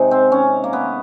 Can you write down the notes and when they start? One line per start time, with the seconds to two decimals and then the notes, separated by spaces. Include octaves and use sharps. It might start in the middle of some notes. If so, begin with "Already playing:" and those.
Already playing: C3 D#3 G#3
0.11 C4
0.32 C#4
0.64 A#3
0.73 B3